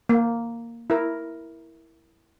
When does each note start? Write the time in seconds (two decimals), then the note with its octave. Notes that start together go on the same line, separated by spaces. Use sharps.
0.09 A#3
0.90 E4 A#4